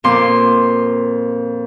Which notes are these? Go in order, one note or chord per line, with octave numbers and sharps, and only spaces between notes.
F2 A#2 C6 D6